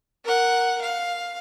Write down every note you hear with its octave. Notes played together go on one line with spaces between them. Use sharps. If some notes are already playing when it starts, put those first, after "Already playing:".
A#4 F#5
F5